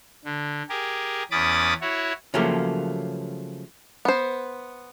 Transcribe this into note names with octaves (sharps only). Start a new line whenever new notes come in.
D3
G4 G#4 A#4
E2 C#4 B5 D6 D#6 A6
E4 F#4 C#5
C#3 F3 F#3 A3 A#3 G4
B3 C5